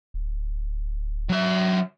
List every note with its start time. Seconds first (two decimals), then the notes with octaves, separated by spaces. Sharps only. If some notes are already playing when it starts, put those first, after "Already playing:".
0.14 D1
1.29 F#3 E5